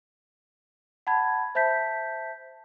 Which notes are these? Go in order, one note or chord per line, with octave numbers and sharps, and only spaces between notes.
F#5 A5 B5 G#6
C5 E5 A5 G6 B6